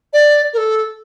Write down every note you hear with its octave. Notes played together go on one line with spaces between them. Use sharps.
D5
A#4
A4